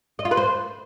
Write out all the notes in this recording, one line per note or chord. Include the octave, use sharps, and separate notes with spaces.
D#5
F4
B4
C5